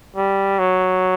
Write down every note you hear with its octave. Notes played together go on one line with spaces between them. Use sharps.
G3
F#3